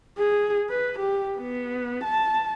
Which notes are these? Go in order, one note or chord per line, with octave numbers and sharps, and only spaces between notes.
G#4
B4
G4
B3
A5